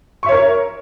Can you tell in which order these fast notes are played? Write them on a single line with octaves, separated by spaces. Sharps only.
C#6 E5 C#5 A#4